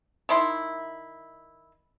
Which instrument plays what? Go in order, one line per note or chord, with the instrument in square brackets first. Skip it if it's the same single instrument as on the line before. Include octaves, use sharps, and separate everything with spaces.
[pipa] D#3 E4 C6